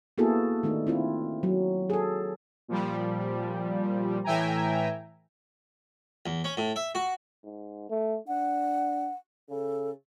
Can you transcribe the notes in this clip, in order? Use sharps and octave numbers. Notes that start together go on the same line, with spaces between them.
A#3 B3 E4 F#4 G#4 A4
D#3 A3 D4 D#4
C4 E4 F4
F#3
G#4 A4
A#2 F3 G3
A2 E3 E5 G5 G#5 A#5
E2
C#4
A2
E5
F#4
G#2
A3
D4 F#5
C#3 A4